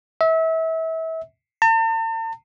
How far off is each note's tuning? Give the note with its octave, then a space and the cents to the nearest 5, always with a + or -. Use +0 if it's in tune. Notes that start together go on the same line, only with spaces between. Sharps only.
E5 -30
A5 +45